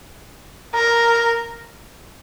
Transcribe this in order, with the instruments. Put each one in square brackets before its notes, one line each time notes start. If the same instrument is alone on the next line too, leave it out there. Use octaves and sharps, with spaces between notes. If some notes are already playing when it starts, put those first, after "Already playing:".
[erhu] A#4